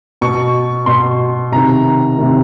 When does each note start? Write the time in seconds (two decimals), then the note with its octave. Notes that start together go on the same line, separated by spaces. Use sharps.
0.21 B2 C#6
0.86 B2 C6
1.52 C3 D#3 A#5
2.18 C3 D#3